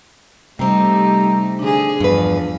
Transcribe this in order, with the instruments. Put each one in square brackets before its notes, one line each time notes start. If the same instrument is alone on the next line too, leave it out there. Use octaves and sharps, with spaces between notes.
[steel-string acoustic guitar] C3 C4 [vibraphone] G3 A#5 [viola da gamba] A3 D#4 G4
[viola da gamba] D3 G#4 [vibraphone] D4
[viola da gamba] E2 F3 [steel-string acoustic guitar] G2 B4